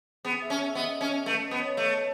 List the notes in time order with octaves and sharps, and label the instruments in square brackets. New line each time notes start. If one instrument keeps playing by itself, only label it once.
[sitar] B3 [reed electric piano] G#4
[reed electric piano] E5
[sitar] C#4
[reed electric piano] E5
[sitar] B3 [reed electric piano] D#5
[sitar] C#4
[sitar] A3 [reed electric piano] B4
[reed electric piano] D#5
[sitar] B3
[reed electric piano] C#5
[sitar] A3 [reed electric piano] C#5